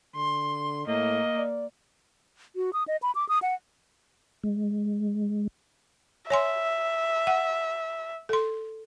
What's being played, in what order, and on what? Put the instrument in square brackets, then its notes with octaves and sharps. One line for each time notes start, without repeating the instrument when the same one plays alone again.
[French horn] D3 [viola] C6
[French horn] A2 [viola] A#3 [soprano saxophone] D#5
[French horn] D5
[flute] F#4
D#6
D#5
B5
D6
D#6
F#5
[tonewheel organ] G#3
[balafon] C#5 G#5 C6 [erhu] E5
[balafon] F#5
A4 C6